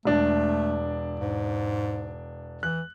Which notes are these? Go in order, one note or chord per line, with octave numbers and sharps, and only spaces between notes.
E1 A3 D4 D5
G#2
E3 F#6